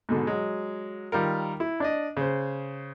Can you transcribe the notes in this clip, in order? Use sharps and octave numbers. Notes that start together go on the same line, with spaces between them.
G#2 B2 D3
F#3 G#3
D#3 G3 F4 A#4
E4
D4 D5 D#5
C#3 C5